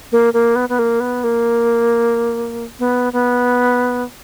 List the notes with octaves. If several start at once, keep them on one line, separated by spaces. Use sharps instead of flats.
A#3
A#3
B3
B3
A#3
B3
A#3
B3
B3